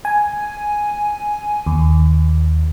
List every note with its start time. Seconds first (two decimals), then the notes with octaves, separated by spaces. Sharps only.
0.05 G#5
1.66 D#2